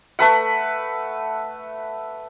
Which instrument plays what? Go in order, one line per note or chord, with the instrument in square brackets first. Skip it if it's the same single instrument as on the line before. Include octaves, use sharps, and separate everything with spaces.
[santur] A3 B4 F#5